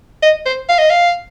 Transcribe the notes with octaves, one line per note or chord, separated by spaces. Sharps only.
D#5
C5
F5
D#5
F5